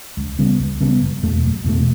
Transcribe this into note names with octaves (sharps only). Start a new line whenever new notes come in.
C#2
C#3 G3 B3
C#2
C#3 G3 B3
F#1
E2 B2 A3
F#1
E2 B2 A3